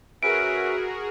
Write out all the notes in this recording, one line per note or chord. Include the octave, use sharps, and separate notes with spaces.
C#4 F#4 G#4 A#4 B4 E5 D7